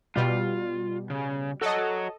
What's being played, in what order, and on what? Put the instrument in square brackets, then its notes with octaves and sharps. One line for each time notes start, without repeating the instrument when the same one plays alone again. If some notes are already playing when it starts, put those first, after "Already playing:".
[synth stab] B2 G3 [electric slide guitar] F4
[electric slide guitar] C#3
[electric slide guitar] F#4 C#5 [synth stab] A4 D#5